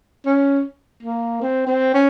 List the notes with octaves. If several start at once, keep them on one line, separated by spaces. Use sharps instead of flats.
C#4
A#3
C4
C4
C#4